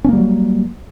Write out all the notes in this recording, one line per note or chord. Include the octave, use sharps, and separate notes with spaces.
F#3 G3 A#3 C#4